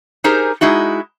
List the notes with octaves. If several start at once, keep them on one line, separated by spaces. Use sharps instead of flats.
D#4 G4 G#4 A#4 C5
G#3 D#4 E4 F#4